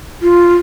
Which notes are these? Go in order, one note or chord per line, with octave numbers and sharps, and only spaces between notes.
F4